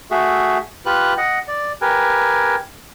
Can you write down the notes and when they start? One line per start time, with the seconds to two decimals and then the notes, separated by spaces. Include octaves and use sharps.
0.11 A3 F#4 G#4 E5
0.86 F4 G4 B4 F#6
1.18 D#5 F#5
1.48 D5
1.81 G4 A#4 B4 G#5